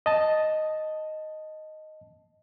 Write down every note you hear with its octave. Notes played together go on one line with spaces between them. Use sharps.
D#5 A5